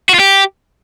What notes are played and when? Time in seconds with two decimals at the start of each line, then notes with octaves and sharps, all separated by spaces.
0.09 F#4
0.14 F4
0.19 G4